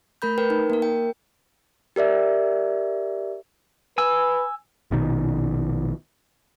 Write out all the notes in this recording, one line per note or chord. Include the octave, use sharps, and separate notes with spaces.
A3 A#4 B5 G6
A#4 B4 G5
D#4
A#3 A#4
G5
G4 A#4 D5 E5
B4 G#5 E6
A#1 B2 D#3